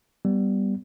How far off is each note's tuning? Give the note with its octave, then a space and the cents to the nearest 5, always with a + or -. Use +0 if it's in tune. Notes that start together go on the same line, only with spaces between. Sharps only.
G3 +0 B3 +0